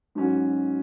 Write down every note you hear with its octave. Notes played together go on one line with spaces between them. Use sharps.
G#2 F#3 C#4 F#4